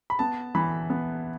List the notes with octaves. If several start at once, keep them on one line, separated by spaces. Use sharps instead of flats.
B5
B3 A5
E3 B5
B3